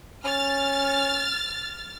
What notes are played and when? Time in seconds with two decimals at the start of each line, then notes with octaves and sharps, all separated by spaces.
0.25 C#4 F6 A6